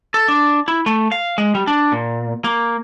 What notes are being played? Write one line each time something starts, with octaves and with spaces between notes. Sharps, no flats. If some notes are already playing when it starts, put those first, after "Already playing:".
A4
D4
E4
A3
F5
G#3
G3
D4
A#2
A#3